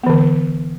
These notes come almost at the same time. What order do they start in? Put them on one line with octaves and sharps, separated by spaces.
B3 E3 D3